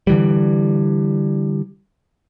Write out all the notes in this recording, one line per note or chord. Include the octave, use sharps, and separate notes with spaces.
D3 E3 G3